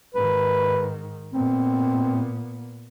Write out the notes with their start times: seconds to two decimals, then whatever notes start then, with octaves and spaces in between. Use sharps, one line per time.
0.15 G#2 D#3 B4
1.34 A#2 B3 C4